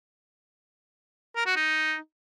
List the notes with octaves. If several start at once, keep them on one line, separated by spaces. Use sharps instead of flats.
A#4
F#4
D#4